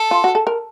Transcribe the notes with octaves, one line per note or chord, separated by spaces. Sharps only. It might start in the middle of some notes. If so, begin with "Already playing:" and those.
Already playing: A4
F4
F#4
A4
A#4